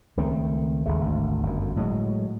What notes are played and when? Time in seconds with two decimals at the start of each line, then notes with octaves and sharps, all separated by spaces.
0.17 C#2 D#3 A3 C4
0.86 G1 D#2 C#3 A3
1.01 G#1 D2
1.43 G1 F#2
1.76 A2 F#3 G#3